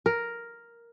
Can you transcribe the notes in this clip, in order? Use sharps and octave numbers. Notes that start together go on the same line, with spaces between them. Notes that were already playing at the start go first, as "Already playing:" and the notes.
A#4